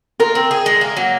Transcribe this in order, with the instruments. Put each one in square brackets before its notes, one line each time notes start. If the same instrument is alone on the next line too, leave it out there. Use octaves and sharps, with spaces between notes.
[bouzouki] F4 [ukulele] A#4
[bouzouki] C4
G#4
G#3
A#3
F#3